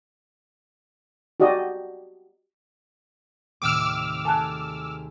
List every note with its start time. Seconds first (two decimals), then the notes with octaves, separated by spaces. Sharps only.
1.40 F#4 G4 D5 D#5
3.62 D#2 A2 C3 D6 E6 F6
4.25 G#4 A4 G#5 A5 F#6